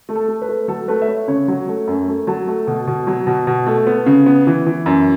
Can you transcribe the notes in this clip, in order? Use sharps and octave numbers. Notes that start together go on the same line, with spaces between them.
A3
A4
A3
B4
A3
F#3 A4
A3 B4
E5
A3 C#5
C#3 C#5
F#3
A3
F#2
A3
F#3 A5
A3
B2
B2
F#3
B2
B2
A3
B3
C#3
B3
E3
E3
F#2